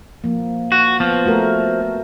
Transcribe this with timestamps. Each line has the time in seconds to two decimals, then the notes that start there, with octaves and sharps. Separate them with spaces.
0.24 F3 A#3
0.72 F#4
1.00 F3 B3
1.26 A3 F#4 A#4